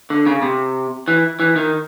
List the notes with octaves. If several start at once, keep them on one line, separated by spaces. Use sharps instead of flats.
D3
C#3
C3
E3
E3
D#3